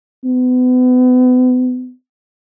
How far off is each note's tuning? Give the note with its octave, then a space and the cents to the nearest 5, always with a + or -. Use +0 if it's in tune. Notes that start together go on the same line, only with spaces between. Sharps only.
B3 +35